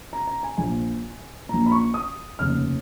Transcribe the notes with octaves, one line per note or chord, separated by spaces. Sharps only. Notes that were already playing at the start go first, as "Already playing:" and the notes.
A#5
A#5
G#5
A#1 A#2 G#5
A#1 A#2 A#5
B5
C#6
D#6
F1 D#2 C#3 F6